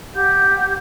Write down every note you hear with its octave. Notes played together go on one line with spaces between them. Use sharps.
G4 F#5 G6